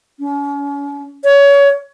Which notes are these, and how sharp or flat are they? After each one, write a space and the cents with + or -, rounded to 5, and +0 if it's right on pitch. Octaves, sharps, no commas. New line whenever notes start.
C#4 +40
C#5 +25